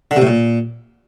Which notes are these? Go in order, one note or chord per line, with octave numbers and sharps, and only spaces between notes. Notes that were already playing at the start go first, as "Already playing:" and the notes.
D3
C3
A2
A#2